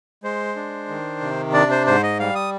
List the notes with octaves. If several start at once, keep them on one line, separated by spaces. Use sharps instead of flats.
G#3 C5
D4
D#3
C3
D4 D5
C5
G#2 C5
D#5
G3 F5
D#6